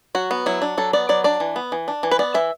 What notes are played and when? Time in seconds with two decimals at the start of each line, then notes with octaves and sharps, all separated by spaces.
0.15 F#3 F#4
0.31 B3
0.46 F#3 E4
0.62 D4
0.78 F#3 A4
0.93 B3 D5
1.09 F#3 D5
1.24 D4 D5
1.40 E3
1.56 B3
1.72 E3
1.88 D4
2.03 E3
2.11 B4
2.19 B3 D5
2.34 E3 E5